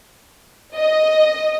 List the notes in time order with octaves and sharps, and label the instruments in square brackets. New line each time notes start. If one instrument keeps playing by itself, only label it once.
[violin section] D#5